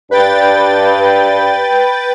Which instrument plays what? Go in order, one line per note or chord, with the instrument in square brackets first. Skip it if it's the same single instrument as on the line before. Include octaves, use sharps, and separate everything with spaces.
[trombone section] G2 D4 [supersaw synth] B4 G5 A6